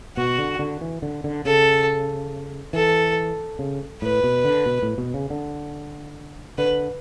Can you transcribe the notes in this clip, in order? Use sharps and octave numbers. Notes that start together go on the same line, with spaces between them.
B2 F#4
D3
D3
E3
D3
D3
C#3 A4
E3 A4
C#3
A2 B4
B2
D3
B2
A2
B2
C#3
D3
D3 B4